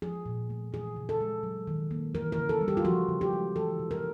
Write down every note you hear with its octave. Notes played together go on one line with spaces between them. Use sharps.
F3 G#4
A#2
A3
E3 G#4
C#3
A4
G#3
F#3
D#3
A#3
E3 A#4
A#4
C#3
A4
G3
G4
F4
F3 F#4
C#3
G4
G#3
E3 A4
C3
A#4